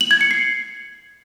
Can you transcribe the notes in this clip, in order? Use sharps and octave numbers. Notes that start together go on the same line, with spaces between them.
F#7
G#6
C#7
C7